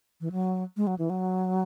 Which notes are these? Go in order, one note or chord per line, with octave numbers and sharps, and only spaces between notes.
E3
F#3
G#3
F#3
E3
F#3